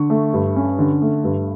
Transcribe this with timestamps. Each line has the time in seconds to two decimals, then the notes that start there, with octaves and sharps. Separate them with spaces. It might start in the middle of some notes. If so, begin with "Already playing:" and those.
Already playing: D3 C#6
0.10 A3
0.33 G2
0.56 C#4
0.79 D3
1.02 A3
1.24 G2